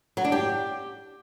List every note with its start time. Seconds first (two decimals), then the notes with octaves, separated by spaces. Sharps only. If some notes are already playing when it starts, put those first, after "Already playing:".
0.17 F#3
0.25 D4
0.32 G4